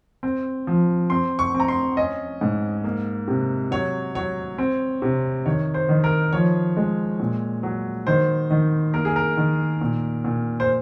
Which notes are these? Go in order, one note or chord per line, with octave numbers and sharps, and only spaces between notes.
C4
F3
C4 C6
C#6
C4
A#5
C6
C#4 D#5
G#2
A#3
C3
F#3 C#5
F#3 C#5
C4
C3
D#3 C#5
C5
D#3
A#4
F3 C#5
G#3
A#2
F#3
D#3 C5
D#3
A#3 A#4
G#4
A#4
D#3
A#2
A#2
C5